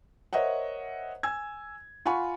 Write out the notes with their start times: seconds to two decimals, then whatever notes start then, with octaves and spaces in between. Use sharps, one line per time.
0.33 A#4 C5 C#5 D#5 E5 F#5
1.23 G#5 E6 G#6
2.06 F4 F#5 G#5 B5 C#6